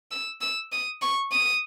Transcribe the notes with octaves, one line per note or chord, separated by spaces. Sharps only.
E6
E6
D#6
C#6
D#6